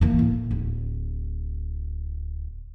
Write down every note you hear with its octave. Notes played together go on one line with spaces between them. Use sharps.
E3 A#3
A2
D1